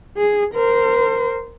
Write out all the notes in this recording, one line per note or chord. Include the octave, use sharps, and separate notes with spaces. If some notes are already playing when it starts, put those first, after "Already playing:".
G#4
A#4 C5